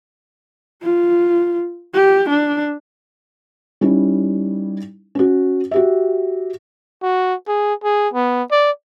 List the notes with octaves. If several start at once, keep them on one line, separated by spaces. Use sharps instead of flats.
F4
G4
D4
G3 C#4 D#4 E4
C#4 F#4
F#4 G4 E5
F#4
G#4
G#4
B3
D5